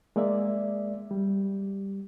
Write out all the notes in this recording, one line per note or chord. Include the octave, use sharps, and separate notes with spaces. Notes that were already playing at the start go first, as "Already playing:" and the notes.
G#3 A#3 D5 E5
G3